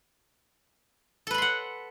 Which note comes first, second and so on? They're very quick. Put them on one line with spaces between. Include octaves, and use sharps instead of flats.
A4 B4 B5 C6 F#5